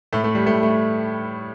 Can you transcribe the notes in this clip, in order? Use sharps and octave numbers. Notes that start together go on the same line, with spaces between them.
A2 A3
A3
G3
A2 A3
A3